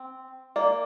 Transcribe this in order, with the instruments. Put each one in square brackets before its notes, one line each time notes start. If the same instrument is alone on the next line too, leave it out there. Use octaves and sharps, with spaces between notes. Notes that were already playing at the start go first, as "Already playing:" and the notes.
Already playing: [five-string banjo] C4
[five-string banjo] A#3 [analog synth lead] D5